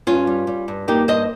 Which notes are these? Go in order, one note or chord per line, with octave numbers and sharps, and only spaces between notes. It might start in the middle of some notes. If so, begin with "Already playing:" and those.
G2 C#4 F4
G3
G3
G2
A#3 D#4 G4
G2 C5 D#5